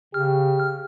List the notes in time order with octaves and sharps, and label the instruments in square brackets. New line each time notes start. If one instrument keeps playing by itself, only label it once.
[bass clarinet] C#3 [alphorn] G4 [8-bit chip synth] F6